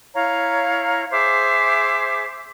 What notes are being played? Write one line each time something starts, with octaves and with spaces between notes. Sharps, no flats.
E4 C#5 F5 A#5
G#4 C5 E5 D6